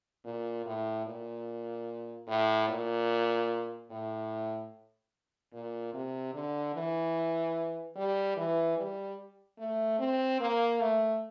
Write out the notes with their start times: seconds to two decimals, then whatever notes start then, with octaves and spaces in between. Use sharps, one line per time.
0.25 A#2
0.65 A2
1.06 A#2
2.27 A2
2.68 A#2
3.91 A2
5.53 A#2
5.94 C3
6.34 D3
6.75 E3
7.96 G3
8.36 E3
8.77 G3
9.58 A3
9.99 C4
10.40 A#3
10.80 A3